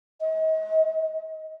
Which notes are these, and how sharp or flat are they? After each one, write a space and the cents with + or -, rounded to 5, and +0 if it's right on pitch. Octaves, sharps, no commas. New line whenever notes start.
D#5 +35